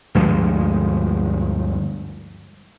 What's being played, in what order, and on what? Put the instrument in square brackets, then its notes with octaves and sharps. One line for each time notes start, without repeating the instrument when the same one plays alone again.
[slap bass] D2 G2 F3 G#3